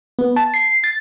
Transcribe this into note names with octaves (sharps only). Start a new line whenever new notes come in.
B3
A5
C7
A6